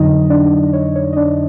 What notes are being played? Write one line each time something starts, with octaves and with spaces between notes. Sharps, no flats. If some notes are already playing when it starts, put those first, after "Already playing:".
Already playing: F2 D3 F#3 D#4 D#5
D4 D5
C#5
C#5
D#5
D4 D5